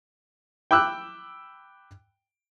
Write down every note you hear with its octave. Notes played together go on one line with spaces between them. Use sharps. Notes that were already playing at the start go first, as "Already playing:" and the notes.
G5 B5 D6 E6 F#6